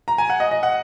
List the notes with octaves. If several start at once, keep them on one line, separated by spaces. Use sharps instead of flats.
A#5
G#5
F#5
D#5
D#5
F#5